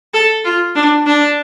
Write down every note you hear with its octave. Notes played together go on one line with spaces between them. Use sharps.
A4
F4
D4
D4